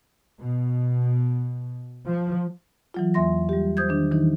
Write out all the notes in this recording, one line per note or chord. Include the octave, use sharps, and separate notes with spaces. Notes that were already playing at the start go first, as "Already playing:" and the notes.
B2
F3
E3 F#3 F4
E2 A#3 E5 C6 A#6
G3 G4
C5 D#6 G6 G#6
D#3 D4
D#3 E3 D#4